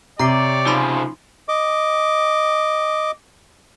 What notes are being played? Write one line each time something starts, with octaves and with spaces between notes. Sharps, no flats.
C3 G4 C#5 D5 A#5 D6 C7
C#3 F3 D#4 B5 C6
D#5 D6